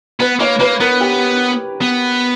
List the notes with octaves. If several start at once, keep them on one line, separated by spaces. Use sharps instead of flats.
B3 B4
A#3 C#5
A#3 B4
B3 A#4
G4
B3